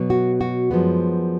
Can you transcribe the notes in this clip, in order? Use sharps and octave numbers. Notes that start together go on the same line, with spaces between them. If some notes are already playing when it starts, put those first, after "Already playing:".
Already playing: B2 F#3 B3
F#4
F#4
F#2 F3 G#3 B3